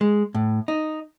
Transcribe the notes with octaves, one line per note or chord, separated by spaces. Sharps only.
G#3
A2
D#4